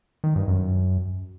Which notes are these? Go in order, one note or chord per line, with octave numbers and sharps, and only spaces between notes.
D#3
G2
F#2